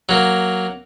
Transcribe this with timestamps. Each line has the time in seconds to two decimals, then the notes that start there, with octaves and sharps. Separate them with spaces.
0.09 F#3 A#3